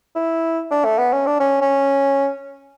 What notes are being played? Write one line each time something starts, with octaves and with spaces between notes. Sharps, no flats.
E4
D4
A3
B3
C#4
D4
C#4
C#4